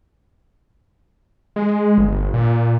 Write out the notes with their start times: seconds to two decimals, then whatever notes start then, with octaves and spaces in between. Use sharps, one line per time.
1.56 G#3
1.98 G1
2.34 A#2